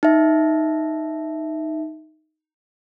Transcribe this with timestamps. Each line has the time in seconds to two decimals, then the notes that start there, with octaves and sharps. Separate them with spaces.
0.03 D#4 E5